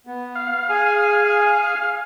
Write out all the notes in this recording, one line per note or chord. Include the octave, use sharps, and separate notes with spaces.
B3
F5
G#4 G#5